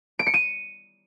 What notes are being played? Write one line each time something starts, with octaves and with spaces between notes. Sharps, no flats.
D7
C#7
D#7